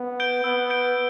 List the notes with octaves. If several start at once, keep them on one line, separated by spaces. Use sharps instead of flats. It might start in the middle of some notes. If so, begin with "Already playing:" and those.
Already playing: B3
G6 D7 G7
B3 E6
G6 D7 G7